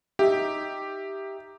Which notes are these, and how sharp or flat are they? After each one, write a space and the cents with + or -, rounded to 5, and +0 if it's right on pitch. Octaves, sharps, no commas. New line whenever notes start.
D#4 +0 G4 +0 E5 +0